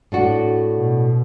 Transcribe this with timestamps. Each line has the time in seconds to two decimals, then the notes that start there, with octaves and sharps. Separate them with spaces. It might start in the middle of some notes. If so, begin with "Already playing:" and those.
0.12 A2 D4 F#4
0.77 B2